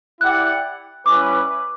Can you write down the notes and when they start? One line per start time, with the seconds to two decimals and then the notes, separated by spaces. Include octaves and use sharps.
0.21 E4 G4 D5 F#5 F#6
1.06 G3 C#4 E4 B4 D6